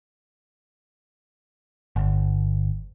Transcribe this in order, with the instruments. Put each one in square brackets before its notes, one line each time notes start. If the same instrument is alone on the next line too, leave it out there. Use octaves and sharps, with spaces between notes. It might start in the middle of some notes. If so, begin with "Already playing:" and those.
[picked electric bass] G1